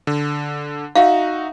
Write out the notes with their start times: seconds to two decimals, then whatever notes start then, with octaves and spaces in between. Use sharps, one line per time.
0.07 D3
0.95 D#4 F#4 E5 F5